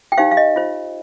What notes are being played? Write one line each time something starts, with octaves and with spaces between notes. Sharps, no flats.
G5
D#4 G4 C5 F5
F5
D#5
F4 C5